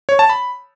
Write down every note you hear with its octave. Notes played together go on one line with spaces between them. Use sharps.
C#5
A5
B5